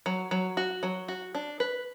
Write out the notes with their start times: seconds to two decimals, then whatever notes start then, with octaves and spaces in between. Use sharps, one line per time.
0.06 F#3
0.31 F#3
0.57 F#4
0.83 F#3
1.08 F#4
1.35 D4
1.60 B4